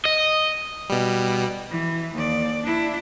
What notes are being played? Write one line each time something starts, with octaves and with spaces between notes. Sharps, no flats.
D#5
B2 G3
E3
D#2 D5
D4 E4